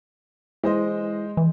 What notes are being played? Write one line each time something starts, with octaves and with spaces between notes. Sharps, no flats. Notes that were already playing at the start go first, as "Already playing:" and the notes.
E3 G#3 C5 D#5
E3